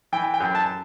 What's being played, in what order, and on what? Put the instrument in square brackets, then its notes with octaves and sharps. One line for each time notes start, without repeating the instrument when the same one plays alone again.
[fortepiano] E3 G5
G5
F#2
A5